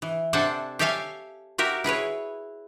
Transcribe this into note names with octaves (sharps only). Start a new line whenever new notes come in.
E3
C3 D4 A4 C5 F#5 G#5
G4 A4 C#5 E5 F5 G#5
F#4 G4 A#4 E5
E4 G#4 B4 C#5